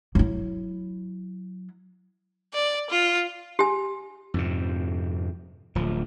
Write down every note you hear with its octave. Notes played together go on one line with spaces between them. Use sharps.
F#3 E4
D5
F4
G4 G#5
F2 G#2 C3
D1 F3